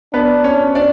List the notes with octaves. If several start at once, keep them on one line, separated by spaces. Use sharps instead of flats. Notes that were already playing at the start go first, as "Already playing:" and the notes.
B3 D4 B4
C#4 C#5
D4 D5